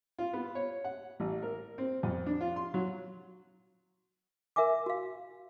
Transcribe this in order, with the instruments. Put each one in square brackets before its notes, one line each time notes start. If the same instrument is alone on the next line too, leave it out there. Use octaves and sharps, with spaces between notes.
[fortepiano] F4
B3
C#5
F#5
A1
A#4
C4
F2
D4
F4
C6
F#3
[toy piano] A#4 E5 F#5 G#5 D6
F#4 F5